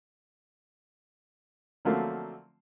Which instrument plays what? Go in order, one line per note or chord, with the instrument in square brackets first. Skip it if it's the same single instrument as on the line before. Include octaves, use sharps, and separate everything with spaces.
[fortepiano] D3 F3 F#3 A3 A#3 C4